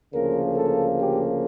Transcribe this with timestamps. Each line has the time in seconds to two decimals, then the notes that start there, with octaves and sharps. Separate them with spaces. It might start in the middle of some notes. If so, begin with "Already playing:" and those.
0.13 D2 C#3 F3 A#3 A#4
0.56 A4
1.00 G4